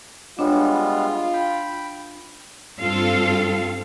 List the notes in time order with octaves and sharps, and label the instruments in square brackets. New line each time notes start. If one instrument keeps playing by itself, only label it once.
[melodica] G3 G#3 B3 [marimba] D4 C#5 [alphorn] F4
[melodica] G5 B5
[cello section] G2 C4 F4 A4 F5